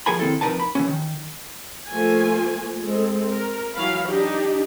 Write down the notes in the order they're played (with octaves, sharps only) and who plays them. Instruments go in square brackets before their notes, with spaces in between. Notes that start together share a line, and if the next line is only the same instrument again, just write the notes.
[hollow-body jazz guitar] F3 G#4 A#4 G#5 B5
D#3 C4 E4 A4
F2 G3 D#4 A#4 B4 A5
B5
E3 B3 C#4
D#3
[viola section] F3 A3 A#3 G#5
G#3 C4 A4
A#4
E3 F#3 F5 B5
D4 D#4 G4